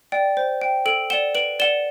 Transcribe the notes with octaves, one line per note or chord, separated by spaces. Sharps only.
D5 G5
C5
G5
A4 D7 F#7
D5 F#5 E7 G7
B4 D7 F#7
D5 F#5 E7 G7